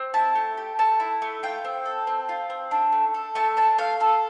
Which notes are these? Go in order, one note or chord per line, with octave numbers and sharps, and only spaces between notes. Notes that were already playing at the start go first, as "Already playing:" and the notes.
Already playing: C4
E4 A5
A3
G4
A3 A5
E4
A3
F4 G5
C4
A4
C4
F4
C4
D4
A3
A4
A3 A5
D4 A5
A3 F5
F4 A4